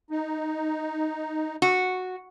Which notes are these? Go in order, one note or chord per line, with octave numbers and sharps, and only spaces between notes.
D#4
F#4